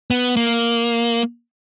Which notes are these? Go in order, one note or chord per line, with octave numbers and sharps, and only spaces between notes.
B3
A#3